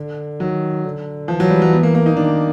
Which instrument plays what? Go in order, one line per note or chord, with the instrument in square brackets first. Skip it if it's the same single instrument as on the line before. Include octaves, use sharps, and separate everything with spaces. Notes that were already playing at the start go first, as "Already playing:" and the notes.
Already playing: [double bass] D3
[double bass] D#3 [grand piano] F#3
[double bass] D3
[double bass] E3 [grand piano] F3
[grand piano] F#3
G3
F#3
B3
A#3
A#3
D#4
[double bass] D#3 [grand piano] D4